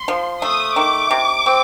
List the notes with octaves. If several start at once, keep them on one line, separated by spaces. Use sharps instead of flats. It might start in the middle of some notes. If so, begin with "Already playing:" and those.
Already playing: C6
F3
A3 D#6
D#3 D6
C3
C4